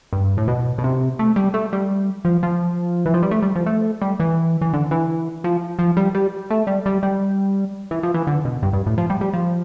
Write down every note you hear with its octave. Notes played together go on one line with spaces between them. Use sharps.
G2
A2
B2
B2
C3
A3
G3
A3
G3
F3
F3
E3
F3
G3
A3
G3
F3
A3
G3
E3
E3
D3
E3
F3
F3
G3
G3
A3
G3
G3
G3
E3
F3
E3
D3
B2
G2
G2
A2
F3
G3
G3
F3